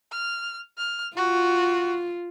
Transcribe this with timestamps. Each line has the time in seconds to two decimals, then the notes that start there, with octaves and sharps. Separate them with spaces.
0.12 F6
0.78 F6
1.17 F4 F#4